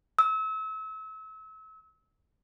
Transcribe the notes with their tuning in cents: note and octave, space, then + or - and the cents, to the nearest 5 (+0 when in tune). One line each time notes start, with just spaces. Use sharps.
E6 -35